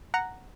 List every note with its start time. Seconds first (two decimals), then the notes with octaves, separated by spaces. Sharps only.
0.14 F#5 A#5